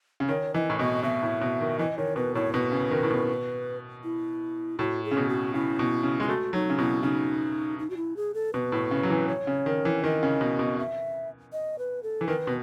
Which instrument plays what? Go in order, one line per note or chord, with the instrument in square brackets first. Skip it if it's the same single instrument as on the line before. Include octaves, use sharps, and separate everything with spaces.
[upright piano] C#3
[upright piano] D#3 [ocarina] C#5
[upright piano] E3 [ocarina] D#5
[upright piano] A2
[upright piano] B2 [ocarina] D#5
[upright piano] B2 [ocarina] E5
[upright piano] A2
B2
D#3
[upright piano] E3 [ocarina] D#5
[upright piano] D#3 [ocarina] C#5
[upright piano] B2 [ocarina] B4
[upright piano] A2 [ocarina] C#5
[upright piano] B2 [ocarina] B4
[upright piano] C#3
D#3
A2
B2
[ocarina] E4
[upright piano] A2 [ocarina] F#4
[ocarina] G#4
[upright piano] C#3
B2
[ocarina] F#4
[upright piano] C#3 [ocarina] E4
[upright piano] B2
C#3
[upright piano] G#3 [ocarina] E4
[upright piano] A3 [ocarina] F#4
[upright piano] F#3 [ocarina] D#4
[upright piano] C#3
[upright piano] B2 [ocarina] E4
[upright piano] C#3 [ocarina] D#4
[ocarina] D#4
F#4
E4
G#4
A4
[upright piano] B2 [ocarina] B4
[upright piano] A2
C#3
F#3
E3
[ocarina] C#5
[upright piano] C#3
D#3
E3
[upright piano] D#3 [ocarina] D#5
[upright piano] C#3
B2
B2
[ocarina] E5
D#5
B4
A4
[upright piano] E3
[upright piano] D#3 [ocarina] B4
[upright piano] B2